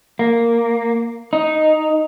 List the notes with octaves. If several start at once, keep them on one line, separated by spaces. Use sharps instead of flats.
A#3
D#4